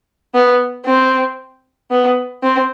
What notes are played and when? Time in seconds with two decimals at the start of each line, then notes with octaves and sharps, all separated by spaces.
0.34 B3
0.86 C4
1.91 B3
2.43 C4